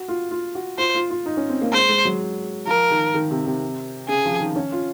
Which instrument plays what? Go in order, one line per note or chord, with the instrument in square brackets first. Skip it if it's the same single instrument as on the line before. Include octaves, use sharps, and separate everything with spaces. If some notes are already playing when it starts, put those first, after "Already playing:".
Already playing: [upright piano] F#4
F4
F4
F#4
[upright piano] F4 [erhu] C5
[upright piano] F4
F4
D#4
C#4
C4
A#3
[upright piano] G#3 [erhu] C5
[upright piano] G#3
F#3
[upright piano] F3 [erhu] A#4
[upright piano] D#3
D#3
C3
C3
[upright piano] C#3 [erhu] G#4
[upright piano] F3
D#3
C#4
F4